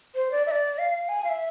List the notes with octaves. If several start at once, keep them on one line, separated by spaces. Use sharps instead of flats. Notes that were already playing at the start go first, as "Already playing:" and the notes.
C5
D5
E5
D5
F5
G#5
F5
E5